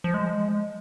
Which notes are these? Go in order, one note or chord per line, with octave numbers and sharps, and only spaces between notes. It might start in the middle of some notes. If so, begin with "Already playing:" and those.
F3
G#3